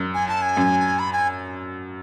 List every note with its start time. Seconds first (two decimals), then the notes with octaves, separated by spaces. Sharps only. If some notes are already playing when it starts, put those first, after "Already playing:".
Already playing: F#2
0.14 G#5
0.28 A5
0.42 G#5
0.57 F#2
0.99 B5
1.13 G#5